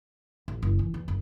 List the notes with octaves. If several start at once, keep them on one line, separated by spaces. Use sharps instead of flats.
A1
F#1
E3
E2
F#1